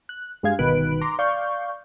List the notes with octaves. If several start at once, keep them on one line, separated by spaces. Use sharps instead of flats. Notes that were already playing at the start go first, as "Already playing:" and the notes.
F#6
G2 G#3 G#4 F5 G#6
G1 B2 D#3 B4 F#6 D7
A#5 C6 D6
D5 F5 C#6 G6